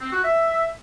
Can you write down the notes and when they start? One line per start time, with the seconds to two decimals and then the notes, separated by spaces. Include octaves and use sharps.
0.01 C4
0.13 F#4
0.24 E5